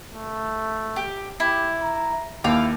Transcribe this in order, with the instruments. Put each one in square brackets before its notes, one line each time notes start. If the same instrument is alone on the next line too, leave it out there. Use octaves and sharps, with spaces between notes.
[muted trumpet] A3
[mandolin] G4
[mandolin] E4 [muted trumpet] G4
[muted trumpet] A#5
[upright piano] D#2 [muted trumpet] E4 [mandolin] F5 G5